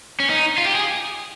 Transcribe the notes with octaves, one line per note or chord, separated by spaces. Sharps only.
C#4
D#4
F4
G4
G#4